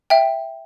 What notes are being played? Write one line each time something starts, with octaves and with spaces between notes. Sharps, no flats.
E5 G5